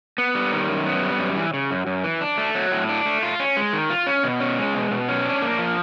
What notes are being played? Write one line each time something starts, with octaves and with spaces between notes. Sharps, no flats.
B3
G3
D#3
F#2
B3
G3
F#2
E3
C#3
F#2
F#2
E3
D4
A3
F#3
A2
D4
A3
F4
C#4
G#3
D#3
F4
C#4
B2
C#4
G#3
B2
B2
C#4
D4
A#3
F3